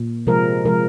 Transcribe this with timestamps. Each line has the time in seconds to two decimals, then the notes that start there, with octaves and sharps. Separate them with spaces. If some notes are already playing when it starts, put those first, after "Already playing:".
Already playing: A#2
0.27 C3 F3 G#3 A#4
0.65 C3 F3 G#3 A#4